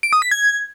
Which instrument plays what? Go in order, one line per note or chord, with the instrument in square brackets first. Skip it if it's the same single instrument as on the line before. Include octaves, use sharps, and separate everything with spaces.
[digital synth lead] D7
D#6
B6
G#6